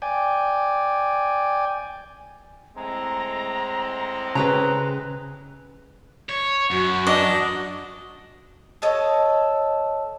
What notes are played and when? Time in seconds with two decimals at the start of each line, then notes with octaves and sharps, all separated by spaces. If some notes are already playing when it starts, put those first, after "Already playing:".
0.02 D5 G5 G#5
2.77 A2 G#3 C4 A#5
4.35 C#3 B4 G5 A#5 F#6
6.29 C#5
6.71 F#2 F#4
7.07 D4 D#5
8.82 A4 C#5 D#5